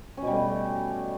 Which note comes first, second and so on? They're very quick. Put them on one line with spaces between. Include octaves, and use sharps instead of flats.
C#4 B2 G3 A3